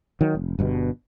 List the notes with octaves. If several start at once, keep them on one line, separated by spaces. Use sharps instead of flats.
D#3 F#3
F1
G1 G2 B2